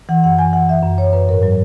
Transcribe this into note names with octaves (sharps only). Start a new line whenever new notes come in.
E3 F#5
F#2 F#5
E3 G#5
E3 F#5
E3 E5
F#2
F#2 C#5
F#2 B4
G#2 A#4
F#3